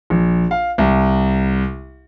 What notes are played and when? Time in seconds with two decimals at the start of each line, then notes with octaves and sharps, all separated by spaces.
0.10 A#1
0.51 F5
0.78 C2